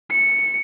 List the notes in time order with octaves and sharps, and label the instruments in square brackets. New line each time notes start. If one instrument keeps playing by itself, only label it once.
[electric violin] C#7